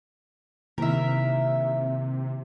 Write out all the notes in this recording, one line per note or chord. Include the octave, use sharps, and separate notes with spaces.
C3 D#3 A#3 E4 A#4 E5